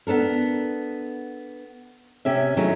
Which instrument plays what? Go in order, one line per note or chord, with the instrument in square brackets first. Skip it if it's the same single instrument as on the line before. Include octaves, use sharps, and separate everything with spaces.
[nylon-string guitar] B3 D4 A4 A#4
C3 C#4 G4 E5
D#3 F#3 A3 C#4 E4 G#4